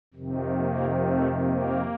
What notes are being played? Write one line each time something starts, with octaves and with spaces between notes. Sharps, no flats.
F2 C3 D#3
A#3
A3
A#3